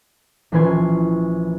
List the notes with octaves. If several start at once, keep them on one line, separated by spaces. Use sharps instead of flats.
A#1 E3 C#4 B4 C6 G#6